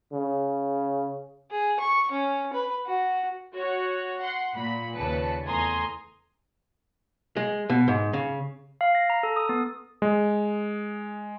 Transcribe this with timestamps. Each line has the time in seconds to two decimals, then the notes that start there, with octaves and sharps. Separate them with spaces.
0.13 C#3
1.51 G#4
1.80 C#6
2.11 C#4
2.53 B4
2.86 F#4
3.54 F#4 C#5 F#5
4.21 F#5 C6
4.55 A#2 B5
4.95 D#2 A#2 C#3 B4 A5 C#7
5.46 E2 A3 G#5 A#5 C6 D#6
7.37 G#3
7.70 B2
7.88 G#2
8.13 C#3
8.81 F5
8.95 A#6
9.10 A#5
9.23 A4
9.36 D#6
9.49 B3
10.02 G#3